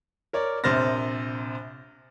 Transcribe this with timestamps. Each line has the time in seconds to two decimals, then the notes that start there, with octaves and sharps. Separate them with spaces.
0.33 A#4 C#5 D5
0.64 A#1 C3 C5 F6 A6 A#6